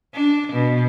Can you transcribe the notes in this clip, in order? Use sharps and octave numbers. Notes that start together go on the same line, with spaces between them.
D4
B2